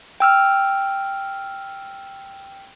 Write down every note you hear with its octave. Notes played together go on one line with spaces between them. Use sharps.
G5 E6 F6